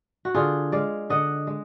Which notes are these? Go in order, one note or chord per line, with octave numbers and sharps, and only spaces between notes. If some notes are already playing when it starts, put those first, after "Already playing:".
F#4
D3 F4 G#4
G#3 D5 F5
D3 D#5 F#5
G#3